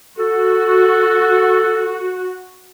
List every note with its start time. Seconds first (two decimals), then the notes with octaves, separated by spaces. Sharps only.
0.19 F#4 A4